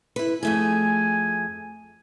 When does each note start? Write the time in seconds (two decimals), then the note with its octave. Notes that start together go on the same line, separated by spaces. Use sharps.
0.16 E4 B4
0.43 F2 A3 G#4 G#5